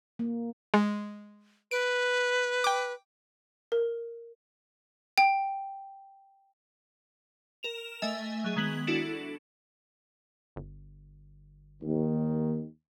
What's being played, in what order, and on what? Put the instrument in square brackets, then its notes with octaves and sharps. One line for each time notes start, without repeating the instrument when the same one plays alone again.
[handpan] A#3
[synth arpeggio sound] G#3
[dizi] B4 [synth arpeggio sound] D7
[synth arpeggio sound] G5 D6
[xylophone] A#4
G5
[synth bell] A#4 E7 F7
A3 D#5 E5 G#5
F#3 G#4
D#3 G#3 B3 F#7
D4 E4 F#4 A4
[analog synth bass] G1
[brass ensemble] D#2 D#3